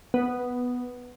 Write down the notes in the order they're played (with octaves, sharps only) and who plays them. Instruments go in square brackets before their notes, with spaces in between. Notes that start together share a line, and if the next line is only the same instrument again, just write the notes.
[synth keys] B3